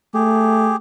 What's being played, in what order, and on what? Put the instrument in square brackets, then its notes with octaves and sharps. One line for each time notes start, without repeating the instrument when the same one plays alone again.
[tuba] A3 [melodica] G4 G#4